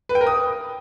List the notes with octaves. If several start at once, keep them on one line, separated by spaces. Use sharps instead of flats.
B4
G5
A#4
D#6